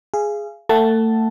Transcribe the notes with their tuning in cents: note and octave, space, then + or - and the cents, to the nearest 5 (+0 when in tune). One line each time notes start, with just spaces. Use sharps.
G#4 +0 F5 -30
A3 +30 F#5 +20 A5 +0